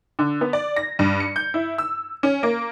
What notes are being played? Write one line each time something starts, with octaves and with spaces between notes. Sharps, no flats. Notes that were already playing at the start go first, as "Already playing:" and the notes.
D3
B3
D5
A#6
G2
C#7
G6
E4
E6
C#4
A#3